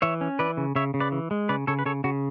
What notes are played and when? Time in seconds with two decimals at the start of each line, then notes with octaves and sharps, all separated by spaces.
0.02 E3 C#5 E5
0.21 C#4
0.39 E3 B4 D5
0.57 C#3
0.76 C#3 C#5 E5
0.94 C#3
1.00 B4 D5
1.12 E3
1.31 G#3
1.49 C#3 B4 D5
1.67 C#3 A4 C#5
1.79 B4
1.86 C#3 A4 C#5
2.04 C#3 F#4